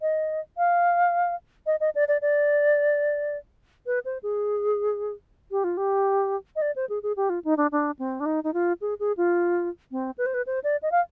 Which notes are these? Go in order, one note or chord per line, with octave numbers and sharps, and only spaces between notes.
D#5
F5
D#5
D#5
D5
D5
D5
B4
C5
G#4
G4
F4
G4
D#5
D5
C5
G#4
G#4
G4
F4
D#4
D4
D4
C4
D4
D#4
D#4
F4
G#4
G#4
F4
C4
B4
C5
B4
C5
D5
D#5
F5